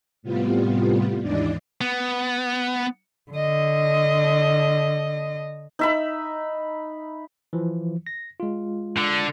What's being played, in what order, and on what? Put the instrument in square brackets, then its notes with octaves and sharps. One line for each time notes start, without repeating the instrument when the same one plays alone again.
[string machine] A2 C3 G3 B3 F4
D#2 G#2 E3 D4 D#4 D5
[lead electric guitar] B3
[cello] D3 D#5
[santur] D#4 E5 B5
[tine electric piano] E3 F3
A#6
G#3 F4
[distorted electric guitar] D3